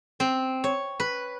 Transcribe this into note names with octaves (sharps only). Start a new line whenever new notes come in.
C4
C#5
B4